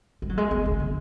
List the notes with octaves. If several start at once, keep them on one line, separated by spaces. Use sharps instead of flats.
G#3
F#3
G#3
B3
D3
D3